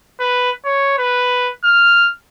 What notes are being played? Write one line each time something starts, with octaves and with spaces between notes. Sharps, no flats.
B4
C#5
B4
F6